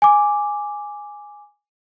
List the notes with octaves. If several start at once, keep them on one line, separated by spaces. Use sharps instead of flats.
G#5 D6